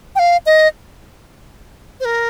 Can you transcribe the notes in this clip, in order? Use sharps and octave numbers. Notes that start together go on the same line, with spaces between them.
G5
F5
D#5
C5
A#4